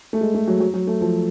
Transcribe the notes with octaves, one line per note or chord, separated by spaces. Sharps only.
A3
G#3
A3
F#3
F#3
F#3
A3
F3